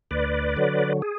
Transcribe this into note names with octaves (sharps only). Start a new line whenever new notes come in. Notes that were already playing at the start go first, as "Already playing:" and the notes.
D2 B4 D5
D3 F#3
G#4